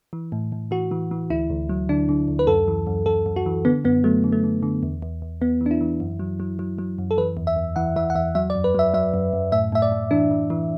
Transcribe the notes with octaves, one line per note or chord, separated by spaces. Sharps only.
E3
A2
A2
E3 F#4
E3
E3
D2 E4
D2
F#3
D3 D4
D3
D2
B4
F#2 A4
E3
F#2
F#2 A4
F#2
F#4
E3
D3 B3
F#2 B3
F#3 A3
D3
A3
D3
D3
E2
E2
E2
E2 B3
E3
D4
E4
E3
F#2
F#3
F#3
F#3
F#3
F#2
A4
E3 B4
E2
E5
E2
E3 F#5
E3 E5
F#5
E2 E5
F#3 E5
D5
F#2
B4
F#3 E5
F#3 E5
F#2
F#2
A2 E5
A2 E5
D5
A2
E3 D4
E3
E3